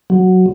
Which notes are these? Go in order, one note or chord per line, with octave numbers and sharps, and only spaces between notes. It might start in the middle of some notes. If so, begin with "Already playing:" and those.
F#3